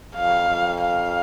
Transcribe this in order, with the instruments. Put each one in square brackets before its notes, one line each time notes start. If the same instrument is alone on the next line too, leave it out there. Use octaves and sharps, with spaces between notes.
[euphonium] F2 [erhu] F5
[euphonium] F2
[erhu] F5